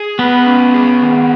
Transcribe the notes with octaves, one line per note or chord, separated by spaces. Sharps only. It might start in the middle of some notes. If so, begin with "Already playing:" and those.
Already playing: G#4
B3 B4
C#4
G#4
D#3